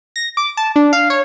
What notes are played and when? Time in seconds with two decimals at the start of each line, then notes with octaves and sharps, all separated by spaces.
0.16 A#6
0.37 D6
0.57 A5
0.76 D4
0.93 F5
1.10 C#5